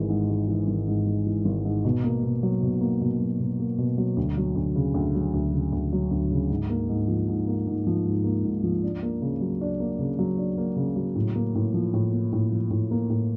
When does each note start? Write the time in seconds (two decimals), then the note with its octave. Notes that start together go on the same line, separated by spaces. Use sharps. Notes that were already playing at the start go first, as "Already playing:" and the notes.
Already playing: G#1 E3 G#3
0.09 G#2
0.29 G#3
0.48 E3
0.68 G#1
0.87 G#2
1.06 G#3
1.26 E3
1.45 G#1
1.65 G#2
1.85 B2
2.04 A#3
2.23 B2
2.43 F#3
2.63 B2
2.81 A#3
3.01 B2
3.20 F#3
3.40 B2
3.60 A#3
3.78 B2
3.98 F#3
4.17 D2
4.37 F#3
4.56 D2
4.76 C#3
4.94 D2
5.15 F#3
5.34 D2
5.54 C#3
5.73 D2
5.93 F#3
6.11 D2
6.31 C#3
6.50 G#2
6.70 A#3
6.89 G#2
7.08 F3
7.28 G#2
7.47 A#3
7.67 G#2
7.87 F3
8.06 G#2
8.24 A#3
8.44 G#2
8.64 F3
8.83 D4
9.03 A#3
9.22 C#3
9.41 F#3
9.61 D4
9.80 A#3
9.99 C#3
10.19 F#3
10.38 D4
10.58 A#3
10.77 C#3
10.96 F#3
11.15 A2
11.36 A#3
11.55 A2
11.74 F3
11.94 A2
12.12 A#3
12.33 A2
12.52 F3
12.71 A2
12.91 A#3
13.10 A2